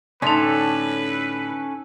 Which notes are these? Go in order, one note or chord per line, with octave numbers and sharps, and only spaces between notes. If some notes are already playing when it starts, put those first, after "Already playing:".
A2 D3 C#4 D#4 A4 B4 C6